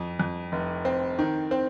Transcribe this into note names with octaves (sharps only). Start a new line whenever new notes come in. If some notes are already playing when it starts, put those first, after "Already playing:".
Already playing: F2
F2
F1
C4
D#3
C4